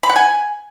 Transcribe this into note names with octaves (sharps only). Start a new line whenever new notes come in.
B5
F#5
G#5